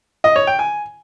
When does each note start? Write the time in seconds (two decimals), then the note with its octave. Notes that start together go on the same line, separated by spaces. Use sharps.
0.24 D#5
0.36 C#5
0.47 G5
0.59 G#5